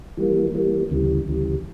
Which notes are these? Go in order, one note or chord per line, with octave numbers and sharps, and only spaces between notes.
E3 G3 A#3
E3 G3 A#3
D2 C#3 E3 G3
D2 C#3 E3 G3